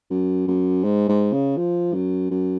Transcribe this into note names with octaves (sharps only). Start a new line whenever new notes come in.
F#2
F#2
G#2
G#2
C#3
F3
F#2
F#2